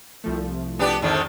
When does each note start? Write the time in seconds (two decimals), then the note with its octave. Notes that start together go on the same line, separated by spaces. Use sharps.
0.24 C2 F3 A3
0.79 B3 D4 G4
1.02 F2 G#2 D3 D#3